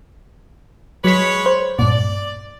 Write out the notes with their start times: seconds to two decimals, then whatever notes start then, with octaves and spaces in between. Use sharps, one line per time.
1.04 F#3 G#3 B4 C#5 B6
1.46 C5
1.79 G2 A#2 D5